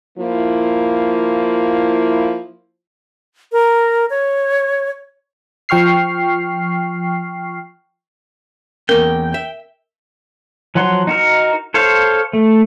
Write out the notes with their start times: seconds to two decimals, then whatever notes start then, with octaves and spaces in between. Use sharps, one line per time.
0.19 F3 A#3 E4
3.52 A#4
4.10 C#5
5.69 F3 G5 C#6 F6 C7
8.89 E2 A#3 C#4 A#4 G5
9.34 E5
10.75 F3 F#3 F#5 C6
11.07 D#4 F#4 A#4
11.74 A4 C5 C#5 F5
12.33 A3